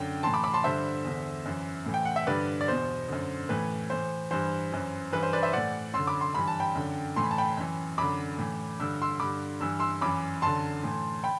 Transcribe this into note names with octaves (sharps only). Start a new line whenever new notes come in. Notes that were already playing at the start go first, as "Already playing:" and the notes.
Already playing: F#2 D3 G5
A2 E3 A5 C6
B5 D6
B5 D6
A5 C6
G2 D3 C5 E5
E2 D3
F#2 E3
A2 E3
G5
F#5
E5
G2 D3 B4 D5
D5
E2 B2 C5
F#2 D3
A2 E3 B4
A2 E3 C5
G2 E3 C5
F#2 E3
G2 E3 B4
C5
B4 D5
C5 E5
A2 E3 D5 F#5
F#2 D3 C6 E6
B5 D6
C6
G2 E3 B5
A5
G5 B5
F#2 D3
A2 E3 C6
B5
A5
G5 B5
F#2 E3
F#2 D3 B5 D6
A2 E3
G2 D3 E6
C6 E6
G2 D3 B5 D6
G2 E3 E6
C6 E6
F#2 E3 B5 D6
F#2 D3 A5 C6
A2 E3
G5 B5